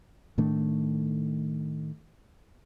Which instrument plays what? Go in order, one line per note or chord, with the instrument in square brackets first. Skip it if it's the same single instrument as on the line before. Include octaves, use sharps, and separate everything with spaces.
[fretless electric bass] A2 D#3 A3 D4